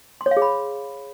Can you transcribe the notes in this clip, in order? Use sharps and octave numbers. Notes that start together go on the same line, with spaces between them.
C6
C#5
F5
G#4
B5